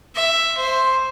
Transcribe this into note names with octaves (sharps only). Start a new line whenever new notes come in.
E5
C5